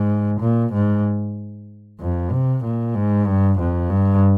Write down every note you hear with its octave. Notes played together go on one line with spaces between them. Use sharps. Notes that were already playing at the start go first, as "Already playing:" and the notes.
Already playing: G#2
A#2
G#2
F2
C3
A#2
G#2
G2
F2
G2